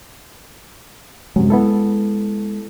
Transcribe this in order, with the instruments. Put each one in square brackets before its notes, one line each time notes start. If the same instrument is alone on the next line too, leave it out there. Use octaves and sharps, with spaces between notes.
[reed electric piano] F#2 C3 F#3 [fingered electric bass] G#3
[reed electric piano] B3 E4 A4